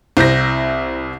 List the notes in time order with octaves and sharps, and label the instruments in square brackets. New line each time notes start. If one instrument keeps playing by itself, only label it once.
[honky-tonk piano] C2 C4 E4 E5 G6 A#6